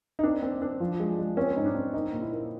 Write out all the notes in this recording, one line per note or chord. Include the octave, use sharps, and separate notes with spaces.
D#4
C4 D4
C4
C4 D4
F3
G#3
G#3
C4 C#4
G#2 D#4
D4
C4
A#3 D#4
A#2
E4
A#3